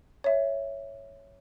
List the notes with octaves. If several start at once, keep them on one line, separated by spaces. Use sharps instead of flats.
C#5 E5